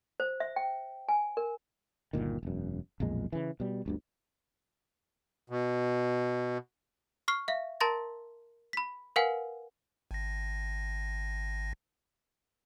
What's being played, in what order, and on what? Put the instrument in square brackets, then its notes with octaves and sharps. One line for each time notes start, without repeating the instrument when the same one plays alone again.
[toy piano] C5
E5
G5
G#5
A#4
[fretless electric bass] G1 D2 A#2 D#3
E1 F#2
B1 F2 A#2 G#3
C#3 E3
B2 G3
G1 D2 G2
[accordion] B2
[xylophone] C#6 F6 C7
E5 F5
A#4 A5 A#5 C6 A6 A#6
B5 B6
A#4 B4 F5 F#5 G#5
[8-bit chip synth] G#1 A#6